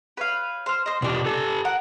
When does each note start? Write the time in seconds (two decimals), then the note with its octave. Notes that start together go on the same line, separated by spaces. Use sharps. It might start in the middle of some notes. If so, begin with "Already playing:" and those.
0.17 B4 C#5 F5
0.66 C5 F6
0.86 C5 D#5
1.02 B2 D4 F4 G4 D5
1.26 G4 A4 A5
1.65 A#4 F#5